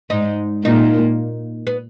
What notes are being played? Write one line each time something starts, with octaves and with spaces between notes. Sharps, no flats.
G#2 G#3 D#4
A#2 A#3 D#4
B3